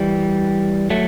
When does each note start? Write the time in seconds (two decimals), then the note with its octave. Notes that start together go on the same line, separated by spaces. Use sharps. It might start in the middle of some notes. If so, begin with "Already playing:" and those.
Already playing: E3 G3
0.90 F#3 A3